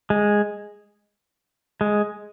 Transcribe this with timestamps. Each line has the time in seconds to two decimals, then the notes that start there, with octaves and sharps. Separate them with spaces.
0.10 G#3
1.81 G#3